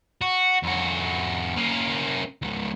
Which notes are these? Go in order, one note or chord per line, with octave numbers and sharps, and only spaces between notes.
F#4
F2 F#4
A#3 C#4
C#2 G#2